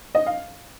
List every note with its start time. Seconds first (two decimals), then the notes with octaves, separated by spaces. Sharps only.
0.15 D#5
0.26 F5